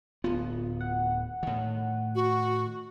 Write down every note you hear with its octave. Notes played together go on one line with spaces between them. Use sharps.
D1 B3 F4
F#5
A2 D#3
F#4